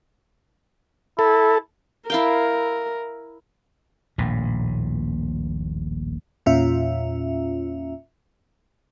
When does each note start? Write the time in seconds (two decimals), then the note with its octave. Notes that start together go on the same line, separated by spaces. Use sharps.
1.19 E4 A4
2.10 E4 A#4 F5 G5
4.18 D#1 A#1 A2
6.46 E2 A#2 C#4 F4 E5